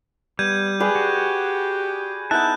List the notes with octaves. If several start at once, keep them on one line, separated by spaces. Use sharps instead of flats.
G3 B3 G6 G#6 D#7
G4 G#4 B4 D5
F#4
B3 D#4 E4 A5 F#6 G6